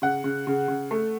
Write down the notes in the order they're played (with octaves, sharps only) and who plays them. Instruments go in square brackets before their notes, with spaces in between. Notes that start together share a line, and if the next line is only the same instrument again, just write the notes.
[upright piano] C#3 F#5
C#3
C#3
C#3
A3